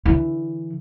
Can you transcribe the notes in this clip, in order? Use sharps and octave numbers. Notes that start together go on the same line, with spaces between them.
D3 E3